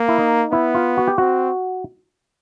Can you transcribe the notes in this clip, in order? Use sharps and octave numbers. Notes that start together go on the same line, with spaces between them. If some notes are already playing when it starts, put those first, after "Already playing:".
Already playing: A#3
E4
D#4
B3 E4
F4
F#4
G4
C4 F#4